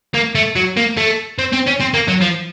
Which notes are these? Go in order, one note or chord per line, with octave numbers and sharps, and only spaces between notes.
A#3
A3
F#3
A#3
A3
C4
C4
C#4
C4
A#3
F#3
F3